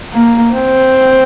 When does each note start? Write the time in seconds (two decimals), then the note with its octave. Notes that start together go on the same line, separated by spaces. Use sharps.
0.13 A#3
0.54 C4